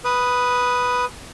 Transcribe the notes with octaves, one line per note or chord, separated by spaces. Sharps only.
B4 D#6